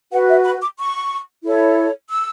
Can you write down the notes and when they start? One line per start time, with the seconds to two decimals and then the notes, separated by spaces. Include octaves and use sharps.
0.11 F#4 B4 F#5
0.28 E5
0.45 B5
0.61 D6
0.78 C#6
1.43 E4 A4 C#5
2.10 E6